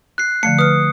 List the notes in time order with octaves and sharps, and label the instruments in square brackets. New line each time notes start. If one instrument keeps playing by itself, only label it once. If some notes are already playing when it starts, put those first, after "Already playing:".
[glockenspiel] F#6 C7
[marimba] D3 F3 A3 [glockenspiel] C#7
[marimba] B4 F6 [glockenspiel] D#6